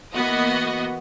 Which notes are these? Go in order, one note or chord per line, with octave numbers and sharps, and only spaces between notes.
E3 A#3 B3 F#4 D#5